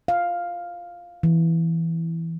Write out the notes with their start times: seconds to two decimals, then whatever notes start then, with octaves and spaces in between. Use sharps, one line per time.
0.08 F5
1.23 E3